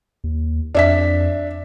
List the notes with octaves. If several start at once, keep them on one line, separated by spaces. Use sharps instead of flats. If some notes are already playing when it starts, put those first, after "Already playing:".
D#2
F2 D4 E5 B6